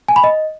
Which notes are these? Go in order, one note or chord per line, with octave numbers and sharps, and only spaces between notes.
G#5
B5
D#5